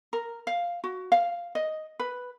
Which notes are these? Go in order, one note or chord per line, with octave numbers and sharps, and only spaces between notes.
A#4
F5
F#4
F5
D#5
B4